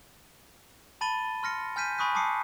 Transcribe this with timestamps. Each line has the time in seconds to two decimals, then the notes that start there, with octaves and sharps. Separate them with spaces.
1.01 A5 B5 A6 D#7 G7
1.43 C6 F6 A#6 C#7
1.76 G#5 F6 G6 B6 D#7
1.98 G#5 B5 C#6 D#6 F#6 B6
2.15 A5 D6 D#6 C7 C#7